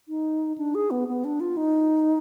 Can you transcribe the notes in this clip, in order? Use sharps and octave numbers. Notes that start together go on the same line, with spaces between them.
D#4
D4
G#4
B3
B3
D4
F4
D#4